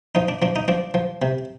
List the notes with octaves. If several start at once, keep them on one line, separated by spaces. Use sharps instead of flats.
F3 D#4
D4
F3 D4
D#4
F3 D4
F3
C3